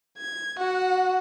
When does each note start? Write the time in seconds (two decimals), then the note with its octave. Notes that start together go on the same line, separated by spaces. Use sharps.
0.18 G#6
0.58 F#4 F#5